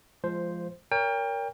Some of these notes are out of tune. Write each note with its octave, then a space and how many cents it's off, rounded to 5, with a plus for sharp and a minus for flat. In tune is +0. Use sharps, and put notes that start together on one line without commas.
F3 -15 G#3 +0 C5 +0
A#4 +0 C#5 +35 G5 +30